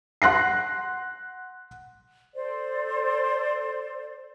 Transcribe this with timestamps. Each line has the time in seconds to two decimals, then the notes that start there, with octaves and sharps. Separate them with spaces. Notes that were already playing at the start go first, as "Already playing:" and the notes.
0.22 F#5 C6 F#6 A#6 C7
2.34 A4 C5 D5